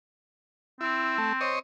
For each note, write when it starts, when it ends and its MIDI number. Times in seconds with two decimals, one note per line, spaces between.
0.81 1.55 60
0.81 1.18 64
1.18 1.33 57
1.41 1.59 72
1.41 1.59 73
1.41 1.59 75